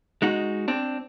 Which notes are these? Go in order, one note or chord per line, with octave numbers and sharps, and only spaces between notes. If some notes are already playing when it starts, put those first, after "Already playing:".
G#3 D#4 F#4
C4 D4